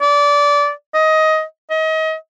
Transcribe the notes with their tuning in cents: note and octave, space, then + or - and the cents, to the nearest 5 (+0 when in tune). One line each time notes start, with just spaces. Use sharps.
D5 -20
D#5 +15
D#5 +35